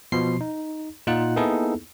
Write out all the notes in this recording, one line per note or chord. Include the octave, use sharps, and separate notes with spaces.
B2 F3 C6 C7
D#4
A#2 D#4 F4 F#5 F#6
A#3 B3 D#4 E4 G#4 A4